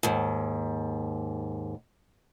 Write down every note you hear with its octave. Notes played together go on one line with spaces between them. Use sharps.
D#2 G#2